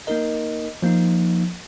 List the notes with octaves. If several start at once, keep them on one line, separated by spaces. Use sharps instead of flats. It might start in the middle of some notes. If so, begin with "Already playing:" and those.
A#3 D#4 A#4 D#5
F3 A#3 D#4